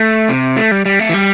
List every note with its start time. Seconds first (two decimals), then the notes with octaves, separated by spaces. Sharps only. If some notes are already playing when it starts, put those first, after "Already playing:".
Already playing: A3
0.29 C3
0.57 A3
0.71 G3
0.85 G3
0.99 A3
1.09 E3
1.14 G3